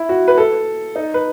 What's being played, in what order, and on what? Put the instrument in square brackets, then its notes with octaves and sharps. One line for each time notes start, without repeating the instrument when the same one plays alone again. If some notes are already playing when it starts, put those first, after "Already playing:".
Already playing: [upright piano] E4
F#4
B4
A4
D#4
B4